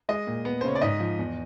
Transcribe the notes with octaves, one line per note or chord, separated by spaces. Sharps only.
G#3 D#5
A#2
B3
C5
C#3 C#5
D5
G#2 D#5
F3
E2